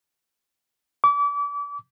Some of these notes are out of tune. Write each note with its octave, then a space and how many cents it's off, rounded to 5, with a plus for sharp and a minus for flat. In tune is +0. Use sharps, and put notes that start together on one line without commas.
D6 -35